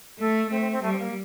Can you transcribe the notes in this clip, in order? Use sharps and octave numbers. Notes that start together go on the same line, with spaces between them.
A3 A4
A3 C4
C4
C4
G3 A3
C4
A#3